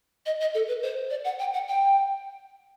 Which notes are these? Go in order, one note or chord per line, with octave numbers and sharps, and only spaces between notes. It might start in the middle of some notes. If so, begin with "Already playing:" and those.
D#5
D#5
A4
B4
C5
D5
F#5
G5
F#5
G5